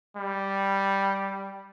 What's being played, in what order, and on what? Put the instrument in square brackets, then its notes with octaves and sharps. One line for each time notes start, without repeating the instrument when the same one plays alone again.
[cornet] G3